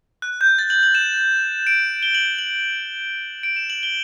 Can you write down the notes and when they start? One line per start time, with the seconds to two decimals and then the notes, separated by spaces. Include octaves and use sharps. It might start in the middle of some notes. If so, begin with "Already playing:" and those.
0.22 F#6
0.41 G6
0.59 A6
0.70 F#7
0.83 F#7
0.95 E7
1.67 D7
2.03 G7
2.15 F#7
2.39 F#7
3.43 D7
3.56 E7
3.70 F#7
3.83 G7